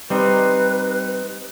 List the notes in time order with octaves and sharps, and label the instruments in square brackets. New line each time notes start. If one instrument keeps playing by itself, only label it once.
[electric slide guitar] G3 C4 D#4 [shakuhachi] B4